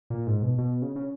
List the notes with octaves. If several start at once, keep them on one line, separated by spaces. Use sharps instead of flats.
A#2
G#2
B2
B2
C#3
C#3